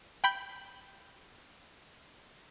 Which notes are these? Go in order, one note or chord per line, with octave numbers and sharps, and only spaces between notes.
G5 B5 G6